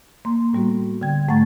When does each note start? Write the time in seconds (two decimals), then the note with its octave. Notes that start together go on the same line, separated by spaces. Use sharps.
0.25 A#3 C6
0.53 A2 G3 B3 F#4
1.01 D3 G5 G#6
1.28 G#2 A3 F#5 A#5 C#6 A6